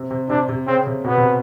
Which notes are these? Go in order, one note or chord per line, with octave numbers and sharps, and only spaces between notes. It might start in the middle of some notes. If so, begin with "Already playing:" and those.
Already playing: C3
C3
C3 D4
C3
C#3 C4
C3
B2 B3
C3